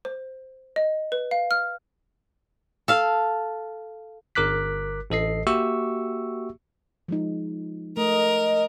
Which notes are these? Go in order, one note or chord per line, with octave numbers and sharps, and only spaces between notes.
C5
D#5
B4
F5
F6
A4 F5
G1 A#4 D6 F#6 B6
A1 A4 D#5 C7
A#3 F#4 G4 E5 C#6 E6
F3 G#3 D#4
A3 A#4 D#5